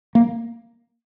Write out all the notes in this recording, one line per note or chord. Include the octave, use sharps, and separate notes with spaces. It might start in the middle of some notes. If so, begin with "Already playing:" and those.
A#3